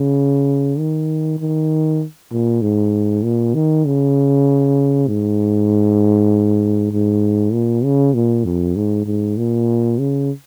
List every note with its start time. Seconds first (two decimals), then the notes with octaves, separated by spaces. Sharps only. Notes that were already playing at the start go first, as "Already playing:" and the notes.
Already playing: C#3
0.78 D#3
1.39 D#3
2.31 A#2
2.62 G#2
3.23 A#2
3.54 D#3
3.85 C#3
5.08 G#2
6.92 G#2
7.53 A#2
7.84 C#3
8.14 A#2
8.45 F2
8.76 G#2
9.06 G#2
9.37 A#2
9.99 C#3